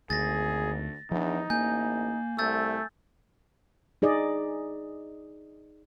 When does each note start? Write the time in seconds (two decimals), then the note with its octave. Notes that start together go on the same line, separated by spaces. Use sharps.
0.10 G#1 D2 G#4 A6 A#6
1.11 E2 F3 D4 D#4
1.50 A1 A#3 G#5 G6
2.39 C2 A3 E6 G6 A6
4.02 D#4 G#4 D5 D#5